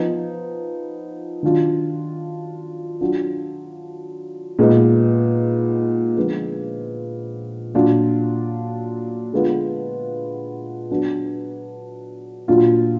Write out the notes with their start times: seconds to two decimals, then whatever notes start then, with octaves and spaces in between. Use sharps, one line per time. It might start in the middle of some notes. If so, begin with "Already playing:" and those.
Already playing: F3 B3 D#4
1.43 D#3 F#3 D4 F4
3.01 F#3 D4 F4
4.59 A#2 G#3 B3 D#4
6.17 D3 F3 G#3 B3 F4
7.75 A#2 F#3 D4 F4
9.33 D3 G#3 B3 F4
10.90 F#3 B3 D4
12.48 A#2 F#3 D4 F4